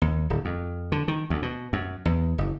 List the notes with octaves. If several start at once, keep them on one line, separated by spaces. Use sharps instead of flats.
D#2
D1
F2
D3
D#3
D2
B2
F#2
E2
F#1